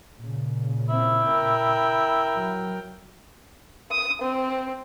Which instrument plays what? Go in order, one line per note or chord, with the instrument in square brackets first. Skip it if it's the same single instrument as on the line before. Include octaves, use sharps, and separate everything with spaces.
[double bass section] A#2 C#3
[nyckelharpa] C4 [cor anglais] E4
[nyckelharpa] A#4 G5
[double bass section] F#3
[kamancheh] D#6
C4